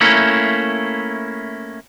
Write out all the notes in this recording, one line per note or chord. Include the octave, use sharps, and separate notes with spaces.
A3 A#3 C#4 E4